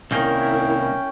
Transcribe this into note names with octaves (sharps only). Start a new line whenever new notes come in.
C2 D#3 A#3 C#4 E4 A#4 G5